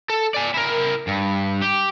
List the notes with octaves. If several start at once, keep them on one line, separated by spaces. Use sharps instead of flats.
A4
D5 G#5
E4 A#4
G2
G4